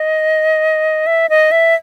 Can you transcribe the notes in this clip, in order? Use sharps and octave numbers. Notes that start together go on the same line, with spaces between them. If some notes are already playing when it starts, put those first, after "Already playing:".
Already playing: D#5
E5
D#5
E5